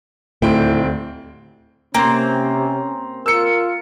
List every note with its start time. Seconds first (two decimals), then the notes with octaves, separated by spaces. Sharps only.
0.42 D#1 D2 A2 C4 G5
1.94 C3 A#3 C4 C#4 A#5 C6
3.26 F4 A#4 E6 C#7